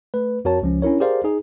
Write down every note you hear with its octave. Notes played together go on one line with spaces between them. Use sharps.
A3 B4
F2 F#4 A#4 C#5 A5
C#2 F3 C#4
C#4 D4 E4 A#4 C#5
G4 G#4 A#4 C5 D5 F5
D#4 G#4